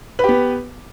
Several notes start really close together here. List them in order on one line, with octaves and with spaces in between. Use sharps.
B4 G4 B3